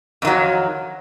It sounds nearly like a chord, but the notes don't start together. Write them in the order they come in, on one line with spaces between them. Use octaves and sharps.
F2 D#3 F#3